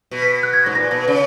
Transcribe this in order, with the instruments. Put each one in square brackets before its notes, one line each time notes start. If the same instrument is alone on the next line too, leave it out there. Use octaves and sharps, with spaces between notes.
[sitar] B2
[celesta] B6
F#6
G#6
[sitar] G#2 [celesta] A#6
[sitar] A#2 [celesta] A#6
[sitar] B2
C#3